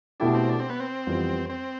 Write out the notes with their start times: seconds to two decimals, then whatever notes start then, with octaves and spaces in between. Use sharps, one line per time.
0.20 B2 A3 D4 E4 G4
0.34 C4
0.49 D4
0.59 C4
0.70 B3
0.80 C4
1.07 F2 E3 G3 B3 F4
1.49 C4